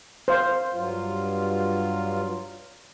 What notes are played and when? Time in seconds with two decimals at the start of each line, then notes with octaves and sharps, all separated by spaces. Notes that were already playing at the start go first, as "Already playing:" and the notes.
0.28 C5 F5
0.73 G2 F#3 F4